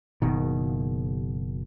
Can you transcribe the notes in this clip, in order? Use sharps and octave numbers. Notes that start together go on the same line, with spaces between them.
F#1 B2 D#3